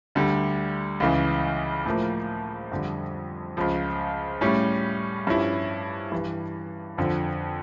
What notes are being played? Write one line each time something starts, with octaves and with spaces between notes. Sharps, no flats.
D2 D3 G3
C#2 C#3 E3
A2 F3 A#3
F2 D3 G3
C#2 C#3 F3
A2 G3 C#4
G2 F3 C#4 E4
G2 E3 G3
F2 D3 F3